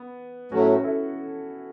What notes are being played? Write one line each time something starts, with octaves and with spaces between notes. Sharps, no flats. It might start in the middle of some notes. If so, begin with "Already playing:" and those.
Already playing: B3
A2 F#3 A3 C#4 F#4
E4 A4